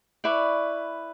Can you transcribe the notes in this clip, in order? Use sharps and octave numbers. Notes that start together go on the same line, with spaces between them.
E4 B4 D5 C#6